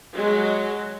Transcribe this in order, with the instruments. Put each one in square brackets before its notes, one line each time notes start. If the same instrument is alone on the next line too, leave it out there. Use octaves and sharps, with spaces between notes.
[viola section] F#3 G#3